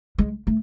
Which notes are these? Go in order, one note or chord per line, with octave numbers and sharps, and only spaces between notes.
G#3
A3